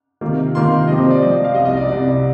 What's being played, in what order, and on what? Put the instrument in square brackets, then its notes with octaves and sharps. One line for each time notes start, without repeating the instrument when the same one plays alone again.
[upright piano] C3 D#3 A#3 F4
[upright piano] C3 D#3 A#3 F4 [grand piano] C6
[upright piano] C3 F3 C4 G4 [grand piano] D#5
[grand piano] C5
D5
[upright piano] C3 F3 C4 G4 [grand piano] D#5
[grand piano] F5
[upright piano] C2 C3 G3 [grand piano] D#5
[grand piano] D#5
D5
[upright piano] C2 C3 G3 [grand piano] D5